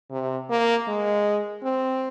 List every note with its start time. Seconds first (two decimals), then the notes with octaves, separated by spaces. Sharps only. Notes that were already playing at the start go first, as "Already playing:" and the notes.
0.11 C3
0.49 A#3
0.88 G#3
1.63 C4